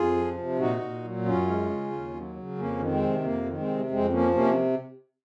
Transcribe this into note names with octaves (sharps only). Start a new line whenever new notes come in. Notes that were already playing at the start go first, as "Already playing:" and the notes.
Already playing: F2 F4 G#4
F3
C3
A#2 D#4 F#4
A#2
F#3
F#2 C#4 F4
G#3
C#3
D#2
F#3
C#3
F2 A#3 C#4
D#3
G#3 C4
C3
F2 A#3
D#3
G#3 C4
C3
F2 G#3 C4
F3 A#3 C#4
C3 A#3 C#4